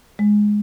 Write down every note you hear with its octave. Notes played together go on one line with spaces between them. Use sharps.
G#3